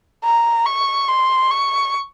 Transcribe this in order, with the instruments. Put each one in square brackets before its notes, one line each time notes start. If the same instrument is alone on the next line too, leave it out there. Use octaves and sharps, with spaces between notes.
[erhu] A#5
C#6
C6
C#6